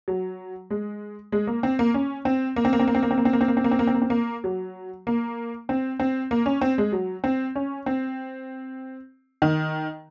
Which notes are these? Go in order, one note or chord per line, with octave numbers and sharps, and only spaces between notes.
F#3
G#3
G#3
A#3
C4
A#3
C#4
C4
A#3
C4
A#3
C4
A#3
C4
A#3
C4
A#3
C4
A#3
C4
A#3
C4
A#3
C4
A#3
C4
A#3
C4
A#3
F#3
A#3
C4
C4
A#3
C#4
C4
G#3
F#3
C4
C#4
C4
D#3